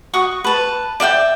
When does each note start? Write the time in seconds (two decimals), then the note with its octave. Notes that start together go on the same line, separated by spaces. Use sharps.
0.14 F#4 C#6 D#6
0.44 B4 A5
1.00 D5 E5 F#5 G5